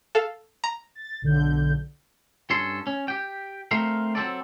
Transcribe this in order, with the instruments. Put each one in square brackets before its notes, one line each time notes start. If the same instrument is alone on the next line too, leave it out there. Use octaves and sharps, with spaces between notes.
[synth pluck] A4 F5
A#5
[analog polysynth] A6
B1 D3 G6
[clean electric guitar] G2 C#4 A4 C6
C#4
G4 G5
A3 C4 A#4 F5
F#3 C4 A4 D5